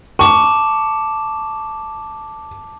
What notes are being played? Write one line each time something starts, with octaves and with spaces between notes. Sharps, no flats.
A5 C#6 D6 E7